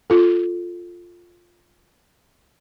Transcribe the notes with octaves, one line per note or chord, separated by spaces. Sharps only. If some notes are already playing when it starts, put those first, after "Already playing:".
F4 A4